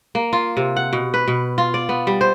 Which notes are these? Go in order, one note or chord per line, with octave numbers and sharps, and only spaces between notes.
A#3
F4
C3
F#5
B2
B4
B2
F4
D5
B3
G3
C5